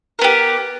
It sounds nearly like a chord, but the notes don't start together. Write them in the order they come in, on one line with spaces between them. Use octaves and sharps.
A#4 B3 G4